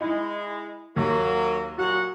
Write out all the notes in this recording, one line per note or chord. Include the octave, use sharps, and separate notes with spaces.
G#3 D#4 E4
D#2 F#3 A#3
A#2 F#3 F#4 F#5